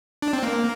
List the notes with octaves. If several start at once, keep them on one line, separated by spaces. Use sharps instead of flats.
D4
C4
A#3